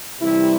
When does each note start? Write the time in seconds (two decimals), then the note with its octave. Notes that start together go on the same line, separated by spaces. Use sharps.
0.21 C3 E3 G3 E4